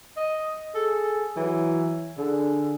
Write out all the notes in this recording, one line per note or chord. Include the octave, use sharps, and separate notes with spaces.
D#5
G#4 A4
E3 F#3
D3 G#4